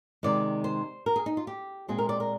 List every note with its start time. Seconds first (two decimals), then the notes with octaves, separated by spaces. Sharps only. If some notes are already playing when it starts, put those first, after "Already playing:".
0.23 C3 D#3 G#3 D5
0.64 C5
1.06 A#4
1.16 G#4
1.26 D#4
1.37 F4
1.47 G4
1.88 A#2 G#3 C4 G#4
1.98 A#4
2.09 D5
2.20 A#4